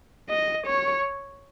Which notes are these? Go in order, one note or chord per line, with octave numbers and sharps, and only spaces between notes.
D#5
C#5